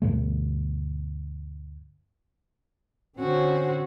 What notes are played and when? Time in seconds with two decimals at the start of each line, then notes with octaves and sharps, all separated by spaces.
0.02 D2 G2 B2 A3
3.18 D3 C4 C#4 F#4 C5